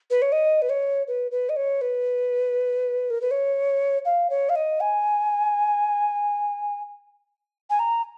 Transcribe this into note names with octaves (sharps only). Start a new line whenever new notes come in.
B4
C#5
D#5
B4
C#5
B4
B4
D#5
C#5
B4
A#4
B4
C#5
F5
C#5
F5
D#5
G#5
G#5
A#5